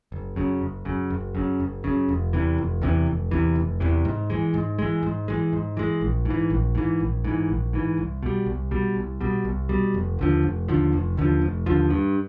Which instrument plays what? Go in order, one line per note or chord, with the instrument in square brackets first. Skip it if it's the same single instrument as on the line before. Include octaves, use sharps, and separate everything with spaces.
[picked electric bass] F#1
F#2 C#3
F#1
F#2 C#3
F#1
F#2 C#3
F#1
F#2 C#3
F1
E2 C3 E3
F1
E2 C3 E3
F1
E2 C3 E3
F1
E2 C3 E3
G#2
E3 G#3
G#2
E3 G#3
G#2
E3 G#3
G#2
E3 G#3
A#1
G#2
E3
A#1
G#2 E3
A#1
G#2 E3
A#1
G#2 E3
C2
B2 G3
C2
B2 G3
C2
B2 G3
C2
B2 G3
F1
D#2 D3 F3
F1
D#2 D3 F3
F1
D#2 D3 F3
F1
D#2 D3 F3
G2